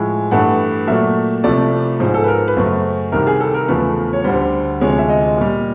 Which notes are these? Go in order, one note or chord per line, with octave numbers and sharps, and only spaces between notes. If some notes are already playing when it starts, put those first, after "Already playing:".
Already playing: A2 F3 G#3
G2 E3 A3 F#5
A#2 F#3 A3 E5
C2 C3 F3 A3 D5
G#2 F3 G#3 C5
A4
B4
A#4
B4
F#2 C#3 F#3 A3 C5
C2 C3 D#3 G3 A#4
G#4
A4
A#4
E2 C#3 F3 A3 B4
C#5
D2 D3 G3 C5
D2 C3 F3 G#3 C#5
E5
D#5
A#2 G3